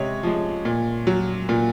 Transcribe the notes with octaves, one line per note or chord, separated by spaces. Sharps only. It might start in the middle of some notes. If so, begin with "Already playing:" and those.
Already playing: C3 G#3 C#5 D#5
F3 G#3
A#2
F#3
A#2